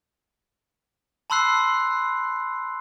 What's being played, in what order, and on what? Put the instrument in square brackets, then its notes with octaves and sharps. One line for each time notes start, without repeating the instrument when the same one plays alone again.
[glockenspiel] A5 B5 C6 E6 F#6 C7